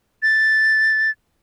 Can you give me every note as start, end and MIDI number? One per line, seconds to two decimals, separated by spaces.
0.23 1.10 93